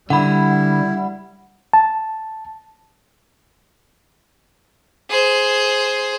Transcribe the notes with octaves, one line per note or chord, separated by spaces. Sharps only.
D3 G3 E4 F#5 B5
A5
G#4 C5